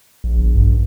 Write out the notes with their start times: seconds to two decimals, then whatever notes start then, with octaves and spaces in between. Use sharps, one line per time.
0.24 A#1
0.38 G1
0.54 G2